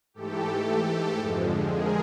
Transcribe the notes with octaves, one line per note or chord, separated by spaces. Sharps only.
G#2 E3 A3 G4 A4
F2 D3 F3 G#3
G#4 A#4